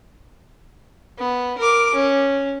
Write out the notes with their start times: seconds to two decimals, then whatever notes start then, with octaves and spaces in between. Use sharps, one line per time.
1.19 B3
1.58 A#4 D6
1.95 C#4